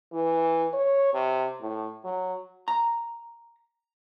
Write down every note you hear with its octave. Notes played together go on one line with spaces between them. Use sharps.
E3
C#5
C3
A2
F#3
A#5